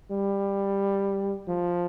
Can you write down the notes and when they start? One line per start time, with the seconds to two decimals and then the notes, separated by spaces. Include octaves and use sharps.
0.11 G3
1.48 F3